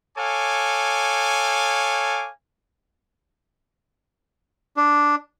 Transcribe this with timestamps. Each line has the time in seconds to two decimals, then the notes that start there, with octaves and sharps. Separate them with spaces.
0.17 A4 C#5 F5 G#5 D6
4.77 D4